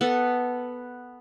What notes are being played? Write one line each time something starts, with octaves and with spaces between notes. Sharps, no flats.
B3 A4